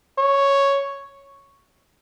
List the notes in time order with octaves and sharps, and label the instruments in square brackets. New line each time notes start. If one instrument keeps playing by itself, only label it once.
[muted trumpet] C#5